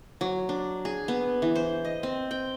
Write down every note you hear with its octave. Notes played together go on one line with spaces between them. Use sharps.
F#3
D4
G#4
B3
E3
C5
D#5
C4
G5